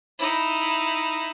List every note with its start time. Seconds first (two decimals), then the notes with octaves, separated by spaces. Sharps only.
0.19 D#4 E4